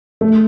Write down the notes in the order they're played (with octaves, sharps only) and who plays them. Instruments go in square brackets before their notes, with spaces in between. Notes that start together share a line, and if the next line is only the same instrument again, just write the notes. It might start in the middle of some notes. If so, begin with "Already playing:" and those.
[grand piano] A3